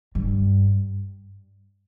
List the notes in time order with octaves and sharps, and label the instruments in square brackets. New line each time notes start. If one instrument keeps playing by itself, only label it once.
[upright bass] G2